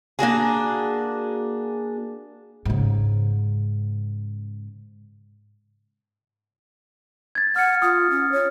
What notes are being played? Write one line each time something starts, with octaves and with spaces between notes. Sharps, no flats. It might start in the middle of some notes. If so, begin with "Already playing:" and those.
A#3 D4 F#4 G#4
G#2 C#3
G#6 A6
F#5 F6 C#7
F4 D#6
C#4
C#5